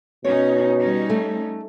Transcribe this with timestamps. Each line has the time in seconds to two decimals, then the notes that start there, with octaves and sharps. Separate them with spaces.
0.25 B2 C#4 D#4 C#5
0.80 G3 C#4 D#4
1.10 A3